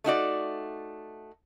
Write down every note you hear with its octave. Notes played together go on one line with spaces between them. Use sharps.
A3 D#4 F#4 D5